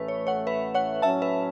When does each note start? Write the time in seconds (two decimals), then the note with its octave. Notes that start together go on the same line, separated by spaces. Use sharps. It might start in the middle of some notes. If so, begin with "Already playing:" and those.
Already playing: A1 A2 E3 A3 C#4 B4
0.08 C#5
0.27 C#5 F#5
0.47 B4 E5
0.74 C#5 F#5
1.02 A2 F#3 C#4 E5 A5
1.22 B4 E5